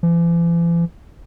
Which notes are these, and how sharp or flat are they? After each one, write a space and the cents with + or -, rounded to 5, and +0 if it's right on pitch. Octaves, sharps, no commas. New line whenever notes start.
E3 +45